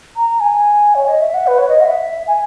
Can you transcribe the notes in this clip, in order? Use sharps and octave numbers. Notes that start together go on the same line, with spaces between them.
A#5
G#5
C#5
D#5
E5
F#5
B4
C#5
D#5
F#5
E5
G#5